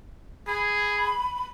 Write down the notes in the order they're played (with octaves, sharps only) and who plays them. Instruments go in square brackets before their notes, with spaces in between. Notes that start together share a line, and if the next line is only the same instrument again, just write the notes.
[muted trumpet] G#4 [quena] B5